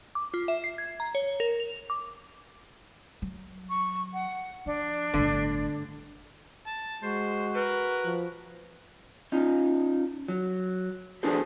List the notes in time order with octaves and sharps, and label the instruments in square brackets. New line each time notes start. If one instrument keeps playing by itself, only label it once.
[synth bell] D6
F4
E5
C7
G#6
A#5
C#5
A#4
F7
D6
[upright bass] F#3
[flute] C#6
F#5
[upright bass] F3 [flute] D4
[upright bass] G1 A2 [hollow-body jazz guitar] D3
[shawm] A5
[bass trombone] G#3 [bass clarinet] F#4 [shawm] C5
[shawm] A#4 [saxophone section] B4
[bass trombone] F3
[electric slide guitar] C#4 D#4 F4
F#3
D4 F#4 G#4 A4 B4 C5